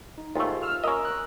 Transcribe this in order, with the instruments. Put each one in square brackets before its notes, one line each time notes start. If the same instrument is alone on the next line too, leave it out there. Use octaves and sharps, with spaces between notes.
[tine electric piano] D#4
[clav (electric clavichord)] D#2 A3 [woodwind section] G#2 [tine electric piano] F4 G4
[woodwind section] E6 F6
[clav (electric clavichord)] C#4 D#5 [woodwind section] A#4 E6
[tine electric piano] F#6